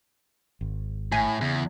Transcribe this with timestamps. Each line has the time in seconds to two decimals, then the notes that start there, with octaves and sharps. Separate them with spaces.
0.61 G#1
1.12 A2 G#5
1.41 E2 C#3